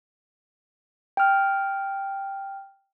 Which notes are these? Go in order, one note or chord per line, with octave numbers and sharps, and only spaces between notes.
G5 F6